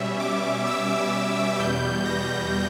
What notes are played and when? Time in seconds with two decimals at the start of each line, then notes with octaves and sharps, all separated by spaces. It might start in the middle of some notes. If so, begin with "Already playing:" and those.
Already playing: B2 G3 C#4 E5
0.20 D6
0.66 E6
1.59 E2 B2 G3 G6
2.05 A#6